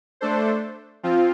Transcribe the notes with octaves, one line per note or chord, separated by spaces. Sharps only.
A3 D4 A4 C5
F3 C4 F4